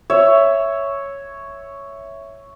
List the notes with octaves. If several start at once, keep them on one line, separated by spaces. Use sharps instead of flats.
C#5 E5